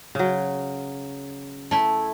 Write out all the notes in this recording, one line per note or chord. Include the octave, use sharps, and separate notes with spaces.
C#3 F#3
A3 E4